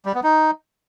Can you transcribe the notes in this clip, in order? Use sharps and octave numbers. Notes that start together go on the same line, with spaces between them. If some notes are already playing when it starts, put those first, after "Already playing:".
G3
B3
D#4